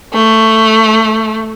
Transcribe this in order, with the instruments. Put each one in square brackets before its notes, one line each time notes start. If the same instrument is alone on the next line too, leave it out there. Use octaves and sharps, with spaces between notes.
[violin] A3